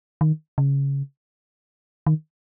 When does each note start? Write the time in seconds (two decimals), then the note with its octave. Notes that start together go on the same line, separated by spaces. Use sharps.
0.21 D#3
0.58 C#3
2.07 D#3